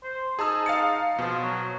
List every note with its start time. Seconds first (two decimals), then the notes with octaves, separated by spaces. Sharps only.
0.04 C5
0.39 D#4 G#4 A5 E6
0.66 F5 A6 C#7
1.18 B2 F3
1.41 F#3